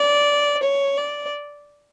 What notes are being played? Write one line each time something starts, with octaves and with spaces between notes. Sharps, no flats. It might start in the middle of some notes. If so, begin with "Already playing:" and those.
Already playing: D5
C#5
D5